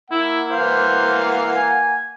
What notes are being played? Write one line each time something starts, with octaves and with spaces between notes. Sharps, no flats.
A#3 E4 F#5
E3 C5 F5
G#5